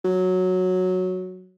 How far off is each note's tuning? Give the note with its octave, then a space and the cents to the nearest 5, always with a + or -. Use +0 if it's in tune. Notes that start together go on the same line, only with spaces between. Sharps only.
F#3 -5